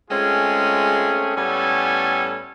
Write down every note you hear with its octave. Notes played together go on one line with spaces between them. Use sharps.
G#3 A3 C4 C#4 F4 G#4
A2 G3 B3 C#4 A4 G#5